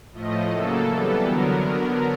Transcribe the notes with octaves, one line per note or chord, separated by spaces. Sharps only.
A2 F3 A3 D#5
C#3 F#3 A#3 A4
E3 G3 B3 A4
D3 F#3 B3 A#4